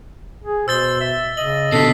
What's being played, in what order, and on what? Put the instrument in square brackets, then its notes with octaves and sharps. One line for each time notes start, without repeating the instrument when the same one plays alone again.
[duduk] G#4
[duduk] B2 [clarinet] C5 [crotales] E6 A6 G7
[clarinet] E5
[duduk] C#3 [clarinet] D#5 [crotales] F#7
[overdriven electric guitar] B2 D3 [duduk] A4 [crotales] B6 C7